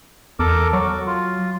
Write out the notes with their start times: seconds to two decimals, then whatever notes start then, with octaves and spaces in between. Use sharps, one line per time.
0.39 E2 A4 A#4 D6
0.73 F#3 F#4
1.07 F4